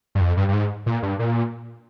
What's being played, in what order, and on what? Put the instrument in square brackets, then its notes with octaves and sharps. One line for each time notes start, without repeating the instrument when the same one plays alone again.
[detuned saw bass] G2
F2
G2
G2
G#2
A#2
G2
A#2